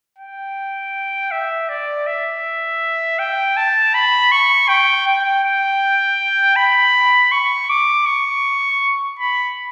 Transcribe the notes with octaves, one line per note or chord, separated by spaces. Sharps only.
G5
E5
D5
E5
G5
A5
B5
C#6
G5
G5
G5
B5
C#6
D6
C#6
B5